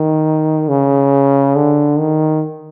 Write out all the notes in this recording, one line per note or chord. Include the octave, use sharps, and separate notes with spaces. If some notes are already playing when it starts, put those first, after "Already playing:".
Already playing: D#3
C#3
D3
D#3